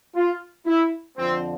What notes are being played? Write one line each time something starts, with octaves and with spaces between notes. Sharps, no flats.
F4
E4
F2 D3 F3 C4